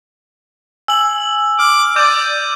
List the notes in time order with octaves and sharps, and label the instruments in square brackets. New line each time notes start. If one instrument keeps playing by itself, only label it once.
[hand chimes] G#5 [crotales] E6 F#7
[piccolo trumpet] D6 [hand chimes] F6
[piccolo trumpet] D5 [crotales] D6 G6 D#7